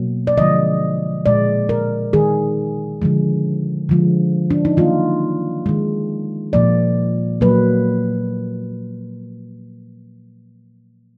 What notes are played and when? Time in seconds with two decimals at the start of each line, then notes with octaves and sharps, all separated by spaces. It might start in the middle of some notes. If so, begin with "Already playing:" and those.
Already playing: B2 F#3 A#3
0.27 D5
0.37 D3 F3 G#3 D#5
1.26 A#2 G#3 D5
1.69 A#4
2.13 D#3 G#3 G#4
3.02 D3 F3 G#3
3.89 D3 F3 G#3
4.51 D4
4.65 D#4
4.77 D#3 F#3 A#3 F4
5.66 D#3 G#3
6.53 A#2 F3 A#3 D5
7.41 A#2 F#3 A#3 B4